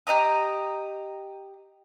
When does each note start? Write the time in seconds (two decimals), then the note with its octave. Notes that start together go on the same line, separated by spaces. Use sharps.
0.07 G4 D#5 A#5 D#6